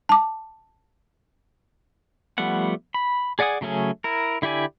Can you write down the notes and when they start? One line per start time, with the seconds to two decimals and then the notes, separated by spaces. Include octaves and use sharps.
0.09 A5 D6
2.38 F3 G3 A3 B3 F#5
2.94 B5
3.39 G#4 D5 F#5 G#5 D#6
3.61 C#3 F#3 A3 C#4 G#4
4.04 E4 A#4
4.42 D3 E4 G4 D5 G#5